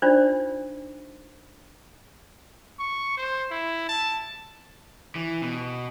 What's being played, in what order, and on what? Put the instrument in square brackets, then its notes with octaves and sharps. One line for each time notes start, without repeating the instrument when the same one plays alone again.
[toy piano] D4 D#4 F4 C5 D5
[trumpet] C#6
C5
E4
A5
[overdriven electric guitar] E3
B2